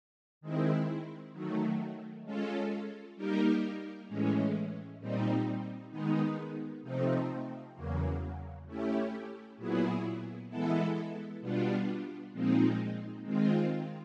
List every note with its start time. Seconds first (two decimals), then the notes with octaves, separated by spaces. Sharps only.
0.41 D#3 G#3 C4 E4
1.33 D#3 F#3 A3
2.24 G#3 C#4 F4 A4
3.16 G3 A#3 D#4 G4 A#4
4.08 A2 E3 G#3 C#4
4.99 A#2 G3 C4 D#4
5.91 D#3 G#3 B3 D#4
6.83 C3 F3 A3 C4 D#4
7.74 E2 C#3 F#3 A#3
8.66 A3 C#4 E4 G4
9.57 A#2 F#3 B3 E4 G#4
10.49 E3 G#3 B3 E4 A4
11.41 B2 G3 B3 D4 F4
12.32 A#2 F3 G#3 C4 D#4
13.24 D#3 G#3 C4 F4